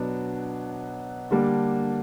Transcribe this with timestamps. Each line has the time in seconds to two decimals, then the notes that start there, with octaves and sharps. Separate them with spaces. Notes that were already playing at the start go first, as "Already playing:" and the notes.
Already playing: B2 F#3 B3 D4
1.31 D3 G3 A#3 D4